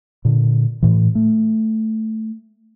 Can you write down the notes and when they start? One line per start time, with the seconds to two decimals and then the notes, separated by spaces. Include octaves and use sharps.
0.25 A#2 D3
0.82 A2 E3
1.15 A3